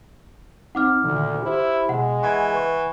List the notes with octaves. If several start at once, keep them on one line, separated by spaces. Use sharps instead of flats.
C4 D#4 F#5 D6 F6
D2 A#2 D3 D#3
E4 G4 C5
B2 G#3 F#5
E3 F#5 C#6 G#6
B4 C#6